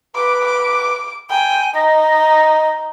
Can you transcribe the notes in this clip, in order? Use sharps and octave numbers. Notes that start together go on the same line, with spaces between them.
B4 D6
D6
G5 G#5
D#4 D#5